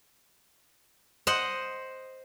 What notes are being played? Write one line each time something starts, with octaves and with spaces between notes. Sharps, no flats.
C5 D#5 F#5